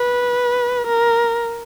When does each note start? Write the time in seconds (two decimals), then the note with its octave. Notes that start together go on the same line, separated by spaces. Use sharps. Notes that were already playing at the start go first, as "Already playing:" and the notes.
Already playing: B4
0.87 A#4